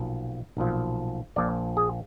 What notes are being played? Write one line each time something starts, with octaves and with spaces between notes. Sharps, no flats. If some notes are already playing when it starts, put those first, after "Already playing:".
Already playing: B1 A#2 F3
B1 A#2 F3
A#1 A#2 F3 D5
G#4